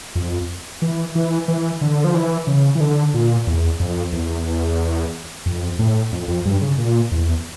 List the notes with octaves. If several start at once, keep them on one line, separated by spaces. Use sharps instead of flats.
F2
E3
E3
E3
D3
F3
E3
C#3
E3
D3
A#2
E2
F2
E2
F2
A2
F2
F2
G2
C#3
A#2
E2